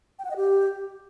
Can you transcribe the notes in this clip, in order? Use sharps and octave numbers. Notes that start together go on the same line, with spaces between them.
G5
F#5
D#5
G4